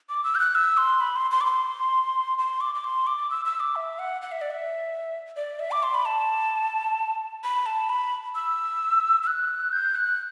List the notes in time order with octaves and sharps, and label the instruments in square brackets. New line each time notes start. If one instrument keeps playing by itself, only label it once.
[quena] D6
E6
G6
F#6
E6
C6
B5
C6
C6
D6
C6
C6
D6
D6
C6
D6
E6
E6
D6
E5
F#5
F#5
E5
D5
E5
D5
E5
D6
C6
B5
A5
B5
A5
B5
E6
E6
F#6
G6
F#6